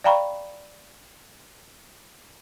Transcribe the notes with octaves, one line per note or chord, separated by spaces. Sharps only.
D5 F5 G5 A#5 B5 C#6